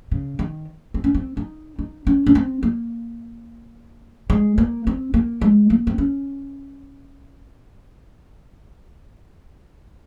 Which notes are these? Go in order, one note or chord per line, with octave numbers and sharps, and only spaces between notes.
C#3
D#3
C4
C#4
C4
D#4
D#4
C#4
C#4
C4
A#3
G#3
A#3
C4
A#3
G#3
A#3
C4
C#4